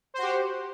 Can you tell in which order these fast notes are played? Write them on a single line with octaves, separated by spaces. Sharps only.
C5 F#4 G4